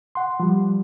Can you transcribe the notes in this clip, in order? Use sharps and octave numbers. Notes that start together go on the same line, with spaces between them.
F#5 C6
F3 G3